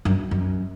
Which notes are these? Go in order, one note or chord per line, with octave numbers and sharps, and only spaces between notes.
F#2
F#2